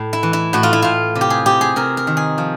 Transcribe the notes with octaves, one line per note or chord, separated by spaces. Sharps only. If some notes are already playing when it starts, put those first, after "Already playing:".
Already playing: A2
E4
E3
E4
A2 F#4
F4
E4
A2 F4
C3
G4
G#4
C3 G4
G#4
C3 A#4
A#4
D#3
G#4
F3